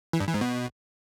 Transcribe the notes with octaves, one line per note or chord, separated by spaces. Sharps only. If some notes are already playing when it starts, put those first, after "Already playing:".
E3
G2
E3
G#2
B2